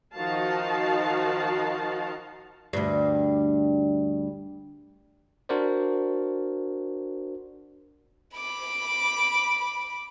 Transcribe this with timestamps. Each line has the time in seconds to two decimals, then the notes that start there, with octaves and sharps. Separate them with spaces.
0.15 D#3 F3 D#4 F#4 F5 A5
2.73 D2 G2
5.49 D4 F#4 A#4 C5 D5
8.36 B5 D6